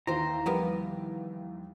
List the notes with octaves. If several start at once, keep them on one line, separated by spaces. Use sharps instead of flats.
D#2 E3 G4 C5 A#5
F3 G3 A#3 B3 G4